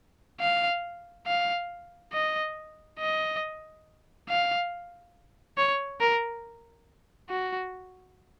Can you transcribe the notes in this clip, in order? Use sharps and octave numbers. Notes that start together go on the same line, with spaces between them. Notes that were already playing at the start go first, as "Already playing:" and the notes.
F5
F5
D#5
D#5
F5
C#5
A#4
F#4